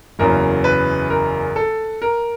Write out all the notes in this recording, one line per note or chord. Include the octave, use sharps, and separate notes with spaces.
F#1 E2 C#3 F#3 A#4
B4
A#4
A4
A#4